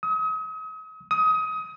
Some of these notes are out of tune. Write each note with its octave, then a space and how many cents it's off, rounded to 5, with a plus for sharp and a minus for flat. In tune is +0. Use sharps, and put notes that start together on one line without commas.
D#6 +40
D#6 +25